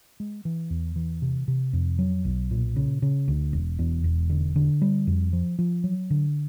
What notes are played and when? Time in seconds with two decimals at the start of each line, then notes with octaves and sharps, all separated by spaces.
0.20 G#3
0.45 E3
0.70 E2
0.96 E3
1.22 C3
1.48 C3
1.73 F2
1.99 F#3
2.25 B1
2.51 A#2
2.76 C#3
3.02 C#3
3.28 D2
3.53 E1
3.79 E2
4.04 E1
4.30 D3
4.56 D3
4.82 G3
5.07 F2
5.33 F3
5.59 F3
5.84 F#3
6.10 D3